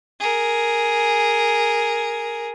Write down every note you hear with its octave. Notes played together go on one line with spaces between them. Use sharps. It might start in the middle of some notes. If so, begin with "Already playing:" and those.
G#4 A#4